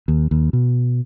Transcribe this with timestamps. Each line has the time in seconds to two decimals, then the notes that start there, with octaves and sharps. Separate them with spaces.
0.08 D#2
0.31 D#2
0.53 B2